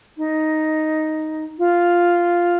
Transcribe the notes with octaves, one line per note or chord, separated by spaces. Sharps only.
D#4
F4